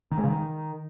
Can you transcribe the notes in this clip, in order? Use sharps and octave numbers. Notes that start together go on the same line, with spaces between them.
D#3
G#3
C#3
D#3